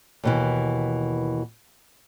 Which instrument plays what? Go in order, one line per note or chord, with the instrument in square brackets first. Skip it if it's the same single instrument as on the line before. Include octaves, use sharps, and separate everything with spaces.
[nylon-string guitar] D#2 B2 E3